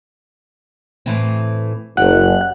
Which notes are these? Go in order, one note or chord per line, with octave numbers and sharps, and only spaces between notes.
A2 E3 C4
F#1 G4 F#5